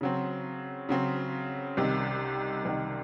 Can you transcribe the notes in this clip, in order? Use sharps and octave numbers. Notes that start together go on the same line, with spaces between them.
C#3 F#3 C4
C#3 F#3 C4
C2 C3 D#3
C2 C3 D#3